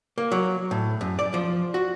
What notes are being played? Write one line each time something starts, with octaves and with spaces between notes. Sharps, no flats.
A#3
F#3
A2
F#2
D5
F3
F#4